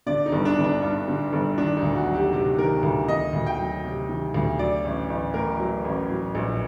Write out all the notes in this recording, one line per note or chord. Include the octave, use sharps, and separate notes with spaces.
D3 D5
D#4
G1
D4
G1
D4
G2 D4
D3
G1
D#3 D4
D#4
D2
F#4
F#3
G4
C3 G4
D#3 A#4
D2
D#3 D#5
D2
G5
F#3
C3
D#3
D2
F#3 D5
A1
A1
A2 A#4
F#3
A1
F#3
A#1